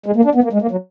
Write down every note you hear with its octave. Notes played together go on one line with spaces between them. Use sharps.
G#3
A#3
D4
B3
A#3
G#3
A#3
F#3